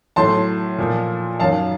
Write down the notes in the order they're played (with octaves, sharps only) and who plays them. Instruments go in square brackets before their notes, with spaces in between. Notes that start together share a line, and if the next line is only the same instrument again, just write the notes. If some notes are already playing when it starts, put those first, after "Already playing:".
[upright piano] A2 F#3 A5 C6
A#2 F3
F#2 D#3 F#3 F5 A5